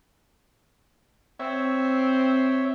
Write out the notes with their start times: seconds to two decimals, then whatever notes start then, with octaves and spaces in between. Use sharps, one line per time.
1.40 C4 C#5 E5